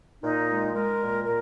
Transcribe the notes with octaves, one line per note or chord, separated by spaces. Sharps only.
A#2 D#4
G#3
G#3 A#4
A#2
A#2 A#4